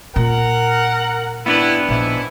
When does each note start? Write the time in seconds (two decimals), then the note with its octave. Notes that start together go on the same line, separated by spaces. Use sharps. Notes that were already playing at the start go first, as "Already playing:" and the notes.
0.16 A#2 A#4 F#5
1.46 B3 D4 E4 B4
1.88 A#1 G#2 E4